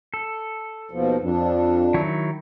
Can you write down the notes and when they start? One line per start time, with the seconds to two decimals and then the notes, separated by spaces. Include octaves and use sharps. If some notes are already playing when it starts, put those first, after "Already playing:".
0.14 A4
0.91 D#2 B2 F3
1.23 F2 D4
1.94 D#3 F#3 E4